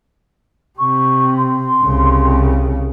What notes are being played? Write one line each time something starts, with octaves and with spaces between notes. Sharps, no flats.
C3 C#6
C6
C2 C#3